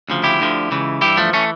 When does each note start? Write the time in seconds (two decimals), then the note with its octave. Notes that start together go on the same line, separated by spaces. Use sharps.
0.09 D2 C#3 F3
0.24 E4 G4
0.39 D2 D3 F3
0.71 C#2 C#3 E3
1.01 G2 E3 E4 G4
1.17 F3 A3
1.33 E3 A3 C#4